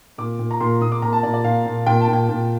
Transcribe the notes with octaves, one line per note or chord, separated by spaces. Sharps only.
A#2 D6
A#2
A#5
A#2 C6
A#2 D#6
D6
A#2 A#5
A5
A#2 D5
D5
A#2 F5
A#2
A#2 G5
A5
A#2
G5
A#2